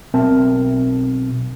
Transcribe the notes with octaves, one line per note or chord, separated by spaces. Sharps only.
B1 C4 A#4 E5 A5